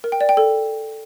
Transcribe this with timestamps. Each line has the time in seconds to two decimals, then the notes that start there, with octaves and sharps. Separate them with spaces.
0.04 A#4
0.12 G5
0.21 D5
0.29 G5
0.37 A4